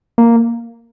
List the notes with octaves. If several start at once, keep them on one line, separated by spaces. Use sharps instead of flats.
A#3